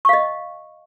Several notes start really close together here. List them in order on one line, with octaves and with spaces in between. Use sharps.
C#6 F5 D#5